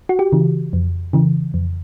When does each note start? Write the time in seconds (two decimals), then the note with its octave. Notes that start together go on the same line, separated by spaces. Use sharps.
0.09 F#4
0.19 G4
0.32 C#3 E3
0.73 F2
1.13 C#3 E3
1.54 F2